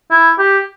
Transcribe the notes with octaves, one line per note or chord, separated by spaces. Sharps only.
E4
G4